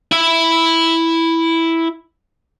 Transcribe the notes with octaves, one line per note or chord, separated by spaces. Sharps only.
E4 E5